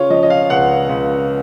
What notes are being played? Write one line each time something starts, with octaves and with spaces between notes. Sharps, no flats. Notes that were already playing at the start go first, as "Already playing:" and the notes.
Already playing: C#3 F4 C#5
F3 D#5
D#5
F5
C#2 F#5
C#2